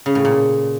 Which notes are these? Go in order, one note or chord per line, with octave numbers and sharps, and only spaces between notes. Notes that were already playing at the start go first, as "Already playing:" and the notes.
C#3
A2
A#2